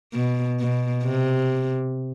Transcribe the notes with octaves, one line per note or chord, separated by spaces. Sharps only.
B2
B2
C3